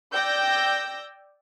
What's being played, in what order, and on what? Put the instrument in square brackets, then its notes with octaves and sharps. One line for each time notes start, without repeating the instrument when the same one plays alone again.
[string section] D5 G5 E6 G6 A#6